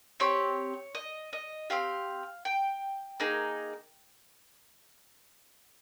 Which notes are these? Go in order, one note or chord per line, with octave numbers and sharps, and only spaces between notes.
C4 G4 C#5
D#5
D#5
C4 G4 F5
G5
A#3 D#4 G#4